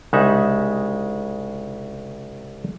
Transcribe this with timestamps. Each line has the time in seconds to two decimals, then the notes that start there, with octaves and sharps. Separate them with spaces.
0.13 C2 C#3 G#3 D#4 E5 F#5